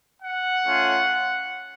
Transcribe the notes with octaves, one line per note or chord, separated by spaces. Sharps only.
F#5
A3 C#4 F4